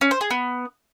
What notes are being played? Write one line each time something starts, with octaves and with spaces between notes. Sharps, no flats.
C#4
C5
G#4
B3